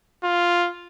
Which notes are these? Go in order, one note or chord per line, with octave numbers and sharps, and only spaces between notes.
F4